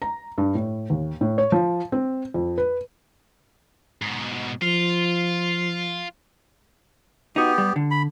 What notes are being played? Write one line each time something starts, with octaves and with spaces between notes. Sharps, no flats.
A#5
G2
A2
D#2
A2
C#5
F3
C4
F2
B4
G#2 B2
F3 F4
B3 D#4 F#4 G4
G3
D3
B5